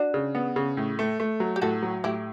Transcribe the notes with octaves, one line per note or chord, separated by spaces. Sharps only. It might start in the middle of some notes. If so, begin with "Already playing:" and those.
Already playing: D4 F#4
C#3
B3
C#3
A2
A3
A3
F#3
G4
A2 F#4 A4
F#3
A2 E4 G4